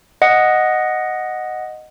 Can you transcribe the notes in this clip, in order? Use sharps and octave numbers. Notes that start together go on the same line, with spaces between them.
D#5 F#5